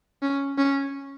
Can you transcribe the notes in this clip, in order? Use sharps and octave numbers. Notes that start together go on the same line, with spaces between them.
C#4
C#4